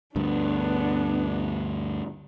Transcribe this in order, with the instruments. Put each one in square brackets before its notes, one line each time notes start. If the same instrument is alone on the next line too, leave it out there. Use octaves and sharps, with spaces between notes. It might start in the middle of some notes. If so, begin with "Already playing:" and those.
[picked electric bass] D2 G2 [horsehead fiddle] B3 D4